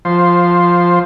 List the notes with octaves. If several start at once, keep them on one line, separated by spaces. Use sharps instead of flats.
F3 C5